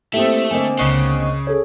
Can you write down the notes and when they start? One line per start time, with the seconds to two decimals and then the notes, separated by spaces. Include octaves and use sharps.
0.14 A3 A#3 C4 E4 G4 E5
0.51 D3 A#3 C4 D#5 G#5
0.79 C#2 C#3 D#5 C#6 F#6
1.47 G#4 A4 C#5